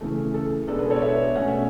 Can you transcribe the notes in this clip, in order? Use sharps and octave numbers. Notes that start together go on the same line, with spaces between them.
C#3 E3 A3
A4
B2 G#3 B3 D4 A4
G#4 B4
A4 C#5
D5
C#5 E5
B2 A3 C#4 F#5
E5